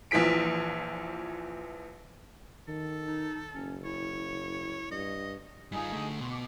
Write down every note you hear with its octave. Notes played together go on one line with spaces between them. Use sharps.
A#1 E3 F3 B6 D7
D#3 A4
D#4
F#1 C#4
E4 C#5
G2 D#5
G2 D#4 F4 G#4 G#5
D3 A3
B2 C6
D6